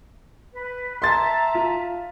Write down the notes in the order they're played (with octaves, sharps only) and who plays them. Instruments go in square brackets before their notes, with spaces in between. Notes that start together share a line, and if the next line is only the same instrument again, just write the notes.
[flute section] B4
[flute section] E5 A5 A#5 [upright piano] C6 A6
[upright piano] F4